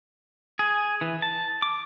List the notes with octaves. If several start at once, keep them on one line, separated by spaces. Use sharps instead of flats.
G#4
E3
A5
D6